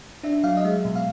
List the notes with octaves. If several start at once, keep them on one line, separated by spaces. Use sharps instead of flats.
D4 E5
F#3 F5
D#5
G#3 E5
B2
F5